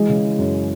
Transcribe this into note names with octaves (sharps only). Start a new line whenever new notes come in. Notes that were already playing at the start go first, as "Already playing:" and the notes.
Already playing: E3 G#3
C#3
E3
F#2